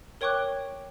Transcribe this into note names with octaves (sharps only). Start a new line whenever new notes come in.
A#4 C#5 G5 C#6 D6 F#6